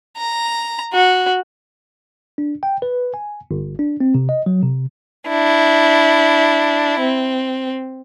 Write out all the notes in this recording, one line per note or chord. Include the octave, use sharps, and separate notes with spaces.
A#5
F#4
D4
G5
B4
G#5
G1
D4
C4
C3
D#5
F#3
C3
D4 E4
C4